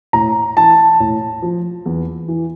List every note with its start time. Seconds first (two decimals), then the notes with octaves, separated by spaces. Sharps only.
0.13 A2 A#5
0.57 E3 A5
1.00 A2
1.42 F3
1.86 E2
2.28 E3